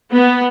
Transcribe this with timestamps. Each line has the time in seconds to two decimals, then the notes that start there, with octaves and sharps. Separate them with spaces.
0.13 B3